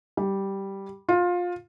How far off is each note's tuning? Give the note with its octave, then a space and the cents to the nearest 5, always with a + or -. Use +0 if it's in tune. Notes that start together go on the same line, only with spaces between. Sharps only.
G3 -5
F4 +20